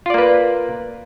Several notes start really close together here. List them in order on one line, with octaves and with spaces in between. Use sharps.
F4 D5 A#3 B4